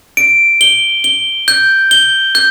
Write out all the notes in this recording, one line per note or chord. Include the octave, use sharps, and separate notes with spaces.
D7
G7
G7
G6
G7
G6